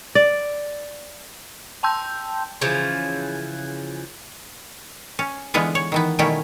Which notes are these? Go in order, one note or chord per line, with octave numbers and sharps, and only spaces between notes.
D5
G5 A5 C6 E6 G6
C#3 E3 F3
C#4
D3 E3 G#3 B3 F4 G#4
C#5
D#3 E3 B3
B2 D#3 G3 A3 C#4 E4